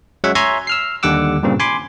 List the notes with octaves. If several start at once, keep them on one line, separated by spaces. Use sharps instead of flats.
F#3 G#3 C#4 C#5 E5 F#5
C#5 E5 G#5 A#5 C6 G#6
E6 F6 C7
D#2 D3 G3 F#5 D6 E6
G2 A#2 C#3 C4
G#5 B5 C6 D6